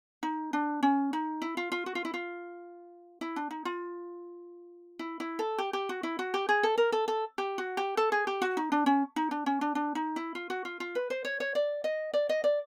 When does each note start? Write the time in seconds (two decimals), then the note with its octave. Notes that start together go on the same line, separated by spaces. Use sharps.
0.23 D#4
0.53 D4
0.83 C#4
1.13 D#4
1.42 E4
1.57 F4
1.72 F4
1.86 F#4
1.95 F4
2.05 E4
2.14 F4
3.21 E4
3.36 D4
3.51 D#4
3.65 F4
4.99 E4
5.20 E4
5.39 A4
5.58 G4
5.73 G4
5.89 F#4
6.03 E4
6.19 F#4
6.34 G4
6.49 G#4
6.63 A4
6.78 A#4
6.92 A4
7.08 A4
7.38 G4
7.58 F#4
7.77 G4
7.97 A4
8.12 G#4
8.27 G4
8.42 F#4
8.57 D#4
8.72 D4
8.86 C#4
9.16 D#4
9.31 D4
9.46 C#4
9.61 D4
9.75 D4
9.95 D#4
10.16 E4
10.35 F4
10.50 F#4
10.65 F4
10.80 F4
10.95 B4
11.10 C5
11.25 C#5
11.40 C#5
11.55 D5
11.84 D#5
12.14 D5
12.29 D#5
12.44 D5